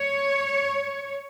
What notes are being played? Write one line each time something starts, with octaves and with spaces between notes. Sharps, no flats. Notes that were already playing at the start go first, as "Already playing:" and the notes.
Already playing: C#5